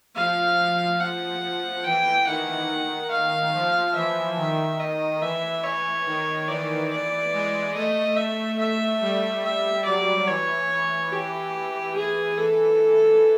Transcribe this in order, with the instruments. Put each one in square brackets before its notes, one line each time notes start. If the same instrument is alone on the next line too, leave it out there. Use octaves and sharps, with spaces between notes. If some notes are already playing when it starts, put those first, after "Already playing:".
[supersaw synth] F3 [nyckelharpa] F5
[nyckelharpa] F#5
[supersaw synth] E3 [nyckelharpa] G5
[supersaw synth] D#3 [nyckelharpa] F#5
[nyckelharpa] F5
[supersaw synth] F3
[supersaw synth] E3 [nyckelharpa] E5
[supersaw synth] D#3
[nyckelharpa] D#5
[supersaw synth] E3 [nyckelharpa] E5
[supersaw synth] E3 [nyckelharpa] C#5
[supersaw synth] D#3
[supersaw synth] E3 [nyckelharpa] D5
[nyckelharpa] D5
[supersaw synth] G#3
[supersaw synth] A3 [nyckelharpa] D#5
[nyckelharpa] E5
E5
[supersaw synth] G3
[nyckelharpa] E5
[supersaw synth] F#3 [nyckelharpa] D5
[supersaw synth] E3 [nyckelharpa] C#5
[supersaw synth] E3 [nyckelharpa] G4
[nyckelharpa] G#4
[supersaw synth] E3 [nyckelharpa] A4